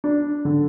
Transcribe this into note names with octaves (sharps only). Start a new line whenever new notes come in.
D4
D3